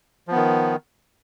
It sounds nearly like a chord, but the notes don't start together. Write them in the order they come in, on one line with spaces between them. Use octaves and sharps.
F3 B3 D#3